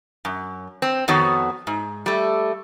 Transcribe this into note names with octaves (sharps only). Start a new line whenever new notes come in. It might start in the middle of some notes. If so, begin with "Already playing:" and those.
F#2
C4
F2 D#3 B3 F#4 A4 C#5
G#2
G3 A3